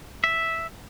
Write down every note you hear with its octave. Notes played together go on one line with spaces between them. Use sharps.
E5